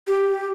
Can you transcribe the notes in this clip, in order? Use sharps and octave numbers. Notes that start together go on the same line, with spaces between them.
G4